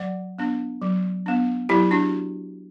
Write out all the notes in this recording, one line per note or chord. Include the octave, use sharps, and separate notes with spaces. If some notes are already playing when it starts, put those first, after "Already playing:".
Already playing: F#3 D5 F#5
B3 D4
F#3
B3 D4
F#3 E4 G4
D4 F#4